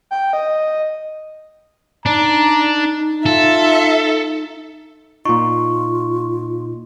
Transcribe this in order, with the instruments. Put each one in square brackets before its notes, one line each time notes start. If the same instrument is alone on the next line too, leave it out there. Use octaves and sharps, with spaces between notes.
[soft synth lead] G5
D#5
[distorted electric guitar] D4 [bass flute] D#4 [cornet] A#5
[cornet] F4 [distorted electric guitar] A4 [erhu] E5
[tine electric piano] A#2 D#4 [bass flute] F4 [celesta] C#6